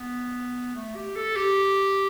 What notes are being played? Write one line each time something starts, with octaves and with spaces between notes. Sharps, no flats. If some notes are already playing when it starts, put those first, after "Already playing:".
Already playing: B3
A3
G4
A4
G4